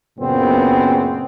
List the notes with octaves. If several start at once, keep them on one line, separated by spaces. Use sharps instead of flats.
F#2 A#2 C#3 B3 C4